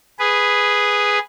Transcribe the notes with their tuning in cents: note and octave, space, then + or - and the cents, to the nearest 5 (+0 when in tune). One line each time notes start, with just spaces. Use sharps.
G#4 -5 B4 +0